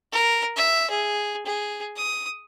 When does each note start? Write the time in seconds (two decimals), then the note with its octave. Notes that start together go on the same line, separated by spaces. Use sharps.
0.13 A#4
0.56 E5
0.90 G#4
1.46 G#4
1.97 D#6